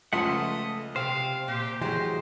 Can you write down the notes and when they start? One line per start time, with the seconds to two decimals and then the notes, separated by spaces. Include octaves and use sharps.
0.13 C#2 F3 A3 D#5 E5 F#5 A5 C6
0.96 C3 C5 F5 G5
1.48 A#2 G4
1.82 A2 E3 F#3 G#3 G4 C5